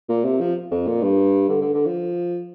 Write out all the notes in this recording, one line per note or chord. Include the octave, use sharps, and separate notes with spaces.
A#2
C3
F3
F2
A#2
G2
D3
D3
D3
F3